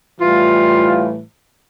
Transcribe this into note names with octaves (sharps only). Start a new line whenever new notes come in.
A2 E3 G3 F4